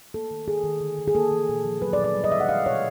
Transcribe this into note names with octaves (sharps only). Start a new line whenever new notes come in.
A#3 A4
D#3
D#3 G#4
D#3
D3
D3
G#4
A#3 A4
E3
A#2
F3
F#3 B4
D5
A#2
D5
G3
D#5
D3 E5
F#5
G#3 F5
B2 C#5